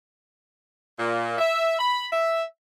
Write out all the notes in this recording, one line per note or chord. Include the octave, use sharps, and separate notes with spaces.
A#2
E5
B5
E5